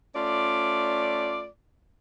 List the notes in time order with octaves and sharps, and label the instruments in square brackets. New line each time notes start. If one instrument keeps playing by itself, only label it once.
[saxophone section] A3 C#4 F4 D5